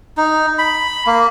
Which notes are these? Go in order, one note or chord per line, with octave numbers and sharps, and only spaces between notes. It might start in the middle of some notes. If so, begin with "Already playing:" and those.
D#4
B5
A#3